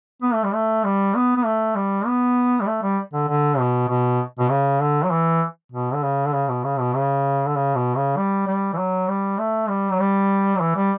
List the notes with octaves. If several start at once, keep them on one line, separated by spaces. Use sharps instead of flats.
B3
A3
G3
A3
G3
B3
B3
A3
G3
B3
G3
A3
G3
D3
D3
B2
B2
B2
C#3
D3
F#3
E3
B2
D3
C#3
D3
C#3
B2
C#3
B2
C#3
D3
C#3
B2
C#3
G3
G3
E3
F#3
G3
A3
G3
F#3
G3
F#3
E3
G3